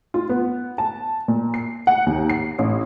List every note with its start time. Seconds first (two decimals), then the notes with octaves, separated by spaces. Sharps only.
0.14 F4
0.29 B3
0.78 A5
1.28 A#2
1.54 C7
1.87 F#5
2.06 D#2
2.29 C7
2.58 A1